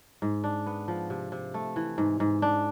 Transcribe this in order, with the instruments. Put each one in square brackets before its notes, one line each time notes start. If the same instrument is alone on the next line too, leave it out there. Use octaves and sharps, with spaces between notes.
[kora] G#2
D4
B3
F3
C3
C3
A3
E3
G#2
G#2
D4